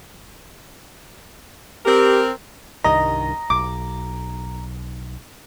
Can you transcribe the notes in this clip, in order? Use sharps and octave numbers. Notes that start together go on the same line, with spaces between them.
C4 G4 A#4
C2 G2 D#3 D#5 A#5
B1 D6